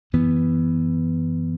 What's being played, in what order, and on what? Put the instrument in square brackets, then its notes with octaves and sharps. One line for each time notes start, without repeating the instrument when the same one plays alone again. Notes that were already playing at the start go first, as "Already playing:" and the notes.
[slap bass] F#2 E3 B3